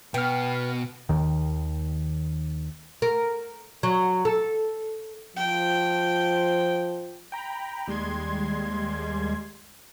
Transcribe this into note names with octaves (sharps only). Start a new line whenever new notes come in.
B2 B3 G5 F6
D#2 D#3
A#4
F#3
A4
F3 G5
G5 A#5 B5
D#2 G3 G#3 C6 G#6